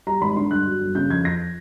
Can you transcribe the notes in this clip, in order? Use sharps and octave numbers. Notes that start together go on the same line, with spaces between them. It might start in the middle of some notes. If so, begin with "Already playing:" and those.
G3 A#5
G#1 B5
D3 C6
G2 F#6
F#3
G1
C#3 G6
F2 G#6
F3 A#6